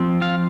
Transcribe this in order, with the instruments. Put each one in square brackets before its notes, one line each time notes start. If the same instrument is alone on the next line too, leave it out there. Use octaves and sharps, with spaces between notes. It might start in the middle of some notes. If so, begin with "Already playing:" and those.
Already playing: [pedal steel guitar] F3 C4
F4 F5